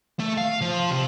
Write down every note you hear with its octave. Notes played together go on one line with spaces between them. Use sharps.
A3
F5
F3
C3